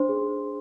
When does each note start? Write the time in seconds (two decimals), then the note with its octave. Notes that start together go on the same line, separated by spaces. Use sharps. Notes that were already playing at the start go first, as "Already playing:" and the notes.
Already playing: D4 C5 C6
0.09 G#4